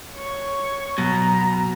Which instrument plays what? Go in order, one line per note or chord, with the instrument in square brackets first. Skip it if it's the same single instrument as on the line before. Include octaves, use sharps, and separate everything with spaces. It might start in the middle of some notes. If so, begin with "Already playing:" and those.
[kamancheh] C#5 C#6
[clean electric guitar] B2 [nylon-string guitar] F#3 [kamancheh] A#5